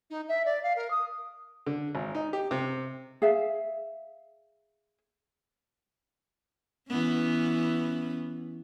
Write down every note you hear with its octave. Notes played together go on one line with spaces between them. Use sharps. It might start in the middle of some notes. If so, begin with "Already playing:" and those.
D#4
E5
D5
F5
A#4
D#6
D3
G#1
D#4
G4
C3
G#4 E5 F5
E3 B3 C#4